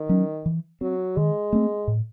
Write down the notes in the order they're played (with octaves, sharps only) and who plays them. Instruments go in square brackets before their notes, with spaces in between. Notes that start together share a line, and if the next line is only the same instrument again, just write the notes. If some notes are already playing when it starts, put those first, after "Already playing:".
Already playing: [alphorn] D#3
[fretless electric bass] F#3 C#4
E3
[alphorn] F#3 [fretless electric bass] C4
[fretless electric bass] D#3 [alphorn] G#3
[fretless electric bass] A3 C4
A2